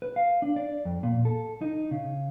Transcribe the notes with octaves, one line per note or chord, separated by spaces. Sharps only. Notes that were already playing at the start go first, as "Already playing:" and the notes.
B4
F5
D4
D5
F2
A#2
A4
D#4
C#3